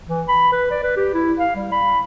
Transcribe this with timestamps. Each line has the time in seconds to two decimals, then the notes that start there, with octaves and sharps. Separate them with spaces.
0.08 E3
0.28 B5
0.52 B4
0.71 D5
0.83 B4
0.96 G4
1.14 E4
1.39 F5
1.55 G3
1.72 B5